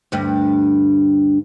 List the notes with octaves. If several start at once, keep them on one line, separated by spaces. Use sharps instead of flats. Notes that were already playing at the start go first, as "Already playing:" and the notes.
D2 G2